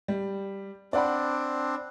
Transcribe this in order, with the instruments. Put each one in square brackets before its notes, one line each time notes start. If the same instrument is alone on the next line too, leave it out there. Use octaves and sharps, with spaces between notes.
[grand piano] G3
[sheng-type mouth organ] C4 D4 [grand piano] D5 F#5 B5